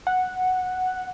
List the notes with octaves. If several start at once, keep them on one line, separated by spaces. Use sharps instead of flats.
F#5